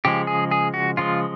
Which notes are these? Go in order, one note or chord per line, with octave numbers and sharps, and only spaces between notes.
C#3 F3 G#3 G4
G#4
G#4
F#4
C#3 F3 G#3 F4